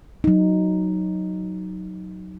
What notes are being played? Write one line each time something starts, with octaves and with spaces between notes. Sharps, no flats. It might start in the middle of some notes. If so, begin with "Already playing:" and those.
F#3 D#4